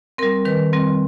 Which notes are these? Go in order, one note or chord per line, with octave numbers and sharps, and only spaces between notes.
G3 C4 A#4
D#3 B4
G3 C4